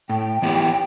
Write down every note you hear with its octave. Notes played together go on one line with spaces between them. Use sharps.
A2 G5
E3 B3 E4 G4